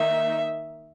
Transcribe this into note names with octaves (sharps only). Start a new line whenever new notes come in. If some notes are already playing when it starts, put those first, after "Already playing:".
Already playing: D#3 A#3 D#4 E5